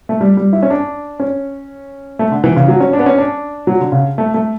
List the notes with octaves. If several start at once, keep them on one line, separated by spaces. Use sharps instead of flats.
A3
G3
G3
E4
C#4
D4
C#4
A3
D3
E3
C#3
F#3
C#4
D4
B3
C#4
D4
F#3
D3
C#3
A3
A3